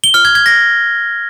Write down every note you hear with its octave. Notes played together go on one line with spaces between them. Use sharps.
G7
F6
G#6
G#6
A#6